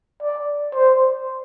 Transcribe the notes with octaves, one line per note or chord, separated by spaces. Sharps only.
D5
C5